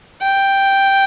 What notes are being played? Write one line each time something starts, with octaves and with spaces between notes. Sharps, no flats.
G5